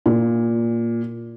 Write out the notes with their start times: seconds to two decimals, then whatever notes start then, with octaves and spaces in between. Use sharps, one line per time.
0.06 A#2